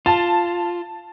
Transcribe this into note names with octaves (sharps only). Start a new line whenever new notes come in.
F4 A5